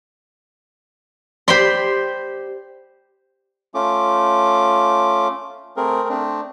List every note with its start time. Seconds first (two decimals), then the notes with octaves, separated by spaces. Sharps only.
1.48 G4 C5 D5 B5 C6
3.74 A3 C#4 F4 D6
5.77 A3 C4 G#4 A#4
6.09 A3 C4 D4